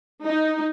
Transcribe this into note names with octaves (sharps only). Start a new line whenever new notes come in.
D#4